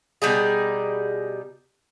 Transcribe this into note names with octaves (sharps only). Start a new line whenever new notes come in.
B2 G3 D#4 G#4